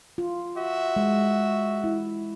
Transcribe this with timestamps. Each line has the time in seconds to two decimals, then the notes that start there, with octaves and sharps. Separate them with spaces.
0.18 F4
0.56 F#4 E5
0.96 G#3
1.84 E4